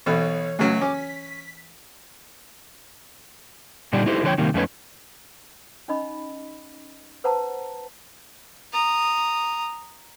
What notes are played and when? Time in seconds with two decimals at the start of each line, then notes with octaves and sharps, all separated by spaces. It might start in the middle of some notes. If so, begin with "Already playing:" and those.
0.06 B1 B2 E3 A4 C#5 B5
0.59 C#2 C#3 F#3 A3
0.81 C#4 G#5 D6
0.94 B6
3.93 A#2 D3 G3 D4 D#4 G4
4.06 D#4 E4 G4 A4 C5
4.23 D3 F3 G4 B4 C#5 G5
4.38 C3 D#3 G3 A#3
4.54 F2 A3 C#4 D#4 B4 C#5
5.88 C#4 D#4 D#5 B5
7.24 B4 C5 F#5 A5 A#5
8.73 A#5 D#6